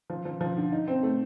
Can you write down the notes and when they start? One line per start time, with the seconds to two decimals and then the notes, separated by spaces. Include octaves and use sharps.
0.10 F3
0.25 F3
0.41 F3
0.57 D3
0.72 D#4
0.88 C4
1.03 A3